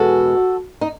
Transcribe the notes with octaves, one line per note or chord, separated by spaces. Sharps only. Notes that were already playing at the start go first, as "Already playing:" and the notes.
Already playing: E2 B2 G#3 F#4 A4
D#4